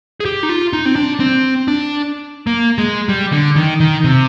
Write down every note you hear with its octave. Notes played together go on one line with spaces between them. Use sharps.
G#4
G4
D#4
F4
D#4
C4
D4
C4
D4
A#3
G#3
G3
D3
D#3
D#3
C3